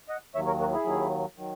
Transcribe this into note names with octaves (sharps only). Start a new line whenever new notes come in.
D#5 F#5
D#2 D#3 F#3 C#5 E5
A#4 C#5
F#4 A#4
E4 G#4
D#2 D#3 F#3
D#3 F#3